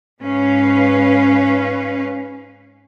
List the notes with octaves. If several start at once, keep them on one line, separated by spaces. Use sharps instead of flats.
G#2 C#4 B4 F5